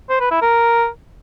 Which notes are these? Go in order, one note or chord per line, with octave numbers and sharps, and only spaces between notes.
C5
B4
E4
A#4